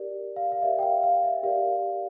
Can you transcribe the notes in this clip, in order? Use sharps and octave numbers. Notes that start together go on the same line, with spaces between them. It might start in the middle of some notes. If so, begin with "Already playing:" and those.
Already playing: G4 A#4 D5
F5
F5
G4 A#4 D5 E5
G5
F5
F5
E5
G4 A#4 D5 F5